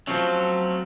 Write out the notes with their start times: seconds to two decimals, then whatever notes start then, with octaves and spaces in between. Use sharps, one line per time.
0.07 F3 F#3 A3 C4 C#4